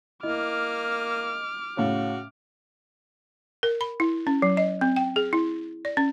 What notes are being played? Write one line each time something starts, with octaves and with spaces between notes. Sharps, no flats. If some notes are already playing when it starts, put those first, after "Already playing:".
A#3 E4 D#5 D6 F6
A2 C#3 F#4 C#5 F5
A#4
B5
E4
C#4
F#3
D#5
C4
G5
G#4
E4
D5
C#4